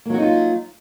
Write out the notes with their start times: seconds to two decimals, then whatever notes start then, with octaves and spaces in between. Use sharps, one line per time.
0.05 A#3
0.10 F#3
0.14 F#4
0.18 D#4
0.22 F4